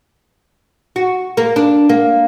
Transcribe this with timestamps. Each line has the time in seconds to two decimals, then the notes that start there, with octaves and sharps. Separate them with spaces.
0.96 F#4
1.37 A#3
1.56 D4
1.89 A#3